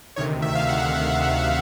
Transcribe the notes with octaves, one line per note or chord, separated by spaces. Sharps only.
D2 C3 D#3 C#5
E5
F5
F#5